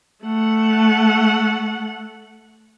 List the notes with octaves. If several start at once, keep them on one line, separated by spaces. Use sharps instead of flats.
A3 F#5